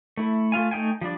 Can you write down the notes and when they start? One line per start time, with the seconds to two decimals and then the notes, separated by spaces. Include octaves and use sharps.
0.17 A3 E4
0.52 A3 F4 F5 G#5
0.71 A3 D#4 G5 G#5
1.01 F3 G3 D4 D5